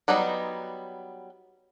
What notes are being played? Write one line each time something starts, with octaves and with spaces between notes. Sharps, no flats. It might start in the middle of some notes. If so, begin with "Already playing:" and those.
F#3 G3 B3 D#4